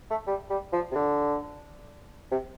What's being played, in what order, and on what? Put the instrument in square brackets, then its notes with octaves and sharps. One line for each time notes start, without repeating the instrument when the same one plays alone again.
[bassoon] A3
G3
G3
F3
C3
D3
C3